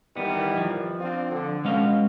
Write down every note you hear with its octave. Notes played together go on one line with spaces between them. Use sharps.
D#3 E3 G3 B3
F3
C4 D4 F4
D3
B2 G#3 C#4 F5